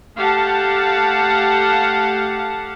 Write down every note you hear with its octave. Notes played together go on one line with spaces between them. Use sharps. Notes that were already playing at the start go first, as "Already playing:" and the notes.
A3 G4 F5 F#5 A5